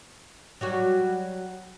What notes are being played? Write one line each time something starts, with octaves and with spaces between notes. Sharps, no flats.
F#3 G3 F#4